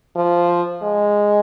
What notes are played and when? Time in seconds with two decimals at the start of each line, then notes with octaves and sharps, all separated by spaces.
0.16 F3
0.82 G#3